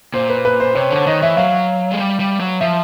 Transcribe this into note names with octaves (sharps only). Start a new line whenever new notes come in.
A#2 C5
B4
B4
C5
C3 C#5
D3 C#5
D#3 D#5
E3 E5
F#3 F5
G#3
G3
G3
F#3
F3 E5